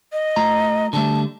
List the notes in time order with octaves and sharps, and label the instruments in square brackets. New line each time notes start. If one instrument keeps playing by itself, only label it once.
[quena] D#5
[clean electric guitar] A3 F4 A#5
[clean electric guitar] D3 G3 A3 [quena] A5